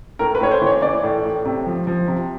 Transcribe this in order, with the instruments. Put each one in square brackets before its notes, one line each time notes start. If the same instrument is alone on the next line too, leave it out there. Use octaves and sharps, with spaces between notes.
[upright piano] A2 A#4
B4
A2 C#5
C5
E3
C#5
E3 D5
A2
A2
C3
F3
F3
C3